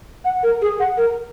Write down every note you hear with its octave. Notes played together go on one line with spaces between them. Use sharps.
F#5
A#4
G#4
F#5
A#4